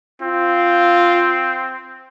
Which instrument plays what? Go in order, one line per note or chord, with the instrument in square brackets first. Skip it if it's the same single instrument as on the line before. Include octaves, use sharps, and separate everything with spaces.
[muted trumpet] C4 [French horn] F4